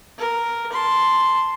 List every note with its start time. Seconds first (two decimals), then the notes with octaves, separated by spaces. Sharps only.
0.18 A#4
0.72 A5 C6